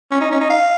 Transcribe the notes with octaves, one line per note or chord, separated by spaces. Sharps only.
C#4
D#4
C#4
D#4
F5